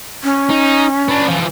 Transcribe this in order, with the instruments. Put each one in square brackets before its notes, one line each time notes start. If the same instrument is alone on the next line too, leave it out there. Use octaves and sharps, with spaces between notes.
[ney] C#4
[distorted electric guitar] D#4
B3 D4
E3 F3